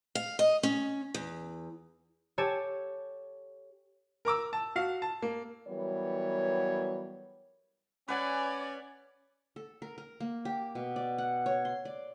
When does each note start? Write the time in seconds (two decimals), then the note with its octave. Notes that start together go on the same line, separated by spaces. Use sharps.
0.15 F5
0.39 D#5
0.63 C#4
1.14 E2
2.38 G4 A4 C#5 G#5 A5
4.25 A#4 A#5 D6 E6
4.53 A5
4.76 F#4 F5
5.02 A5
5.22 A#3
5.68 E3 F#3 G3 B3 A#4 C#5
8.08 C#4 B4 D5 F#5 G#5
9.56 A4
9.82 A#4
9.98 A#4
10.20 A#3
10.45 G4
10.75 B2
10.96 D5
11.18 F#5
11.46 C#5
11.65 C6
11.85 D5